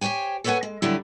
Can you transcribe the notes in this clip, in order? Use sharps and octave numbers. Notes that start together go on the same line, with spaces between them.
G4 C5 C#5 G5 G#5
A4 B4 C#5 E5 F#5 G#5
G#3
D3 F#3 G3 E4